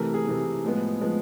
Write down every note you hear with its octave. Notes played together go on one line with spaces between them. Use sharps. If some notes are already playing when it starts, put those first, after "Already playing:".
Already playing: C3 E3 A3 A#4
G#4
C3 E3 A3
A2 F3 G#3 B3
A2 F3 G#3 B3